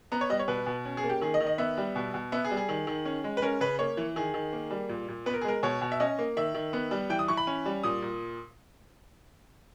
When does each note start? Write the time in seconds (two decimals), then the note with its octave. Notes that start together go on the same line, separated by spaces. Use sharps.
0.12 B3 A#5
0.21 C#5
0.30 G3 D#5
0.39 C#5
0.48 B2 B4
0.67 B2
0.85 C#4
0.97 G#4
1.04 A#3
1.10 G4
1.21 D#3 G#4
1.34 D#5
1.40 D#3
1.47 D#5
1.58 B3 E5
1.78 G3
1.96 B2
2.14 B2
2.32 B3 E5
2.45 G#4
2.51 G3
2.57 G#4
2.69 D#3
2.87 D#3
3.05 C#4
3.24 G#3
3.37 B4
3.42 C#4 A#4
3.61 C#3 B4
3.79 A#3 C#5
3.97 E3
4.16 D#3 G#4
4.34 D#3
4.53 A#3
4.71 G3
4.89 A#2
5.08 A#2
5.26 B3 B4
5.34 A#4
5.41 G#4
5.45 G#3 A#4
5.63 B2 C#5
5.82 B2
5.92 E5
6.00 C#4 D#5
6.19 A#3
6.37 D#3 E5
6.54 D#3
6.73 B3
6.91 G3
7.10 E3 G5
7.19 D#6
7.28 E3 C#6
7.37 B5
7.47 C#4
7.66 G3
7.83 A#2 D#6
8.02 A#2